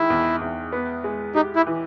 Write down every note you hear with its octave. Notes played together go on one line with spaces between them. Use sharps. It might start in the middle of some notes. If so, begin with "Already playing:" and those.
Already playing: D#3 G#3 E4
E2
E2
B3
G#3
D#4 G4
E4
E3